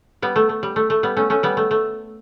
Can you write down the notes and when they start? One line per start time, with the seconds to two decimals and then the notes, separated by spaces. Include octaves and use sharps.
0.22 G3 B3
0.36 A3
0.49 A3
0.63 G3
0.76 A3
0.90 A3
1.03 G3 B3
1.17 A3 C#4
1.30 A3 C#4
1.43 G3 B3
1.57 A3
1.71 A3